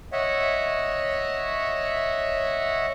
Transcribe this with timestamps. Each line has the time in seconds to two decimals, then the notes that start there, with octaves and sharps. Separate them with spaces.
0.12 C#5 D#5 E5 F#5